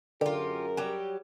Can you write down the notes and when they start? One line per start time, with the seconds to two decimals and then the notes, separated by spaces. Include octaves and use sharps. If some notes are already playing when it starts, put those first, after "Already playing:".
0.21 F#2 D3 F4 G4 G#4 A#4
0.77 F#3 G3 G4